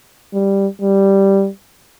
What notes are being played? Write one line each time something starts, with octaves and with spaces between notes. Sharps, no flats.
G3
G3